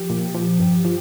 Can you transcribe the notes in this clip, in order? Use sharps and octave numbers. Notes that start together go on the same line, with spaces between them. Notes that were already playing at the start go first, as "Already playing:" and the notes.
Already playing: F3 G4
A#2
F3
G2
F3